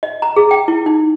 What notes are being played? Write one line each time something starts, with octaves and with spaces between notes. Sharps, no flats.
D#5
A#5
G#4
G5
E4
D#4